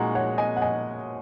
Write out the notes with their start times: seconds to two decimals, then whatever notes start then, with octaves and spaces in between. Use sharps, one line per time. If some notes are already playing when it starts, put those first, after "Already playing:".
Already playing: A#2 G#3 D#4 F#4 F#5 A#5 C#6
0.15 C#5 F#5
0.38 D#5 G#5
0.56 F#5
0.62 D#5 G#5